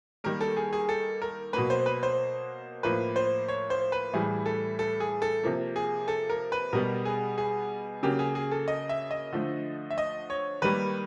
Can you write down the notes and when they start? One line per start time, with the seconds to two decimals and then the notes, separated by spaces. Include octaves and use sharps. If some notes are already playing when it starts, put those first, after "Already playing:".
0.24 D#3 G3 A#3 A#4
0.41 A4
0.57 G#4
0.73 G#4
0.89 A4
1.22 A#4
1.53 B2 F#3 A#3 B4
1.70 C5
1.86 B4
2.03 C5
2.83 A2 F3 A#3 B4
3.16 C5
3.48 C#5
3.70 C5
3.92 B4
4.13 A2 E3 G3 G#4
4.46 A4
4.79 A4
5.00 G#4
5.22 A4
5.43 C3 F3 A#3
5.76 G#4
6.08 A4
6.30 A#4
6.52 B4
6.73 B2 G3 B3 A#4
7.05 G#4
7.38 G#4
8.03 C#3 F#3 A#3 G4
8.19 G#4
8.35 G#4
8.51 A4
8.68 D#5
8.89 E5
9.11 D#5
9.33 D3 F3 A3
9.90 E5
9.98 D#5
10.30 C#5
10.62 D#3 G3 A#3 B4